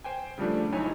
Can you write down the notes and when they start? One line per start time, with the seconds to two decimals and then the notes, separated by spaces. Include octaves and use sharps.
0.04 C5 G5 G#5
0.38 C#3 F3 G3 A3 D4
0.72 A1 F#3 D#4 E4 C#5 G#5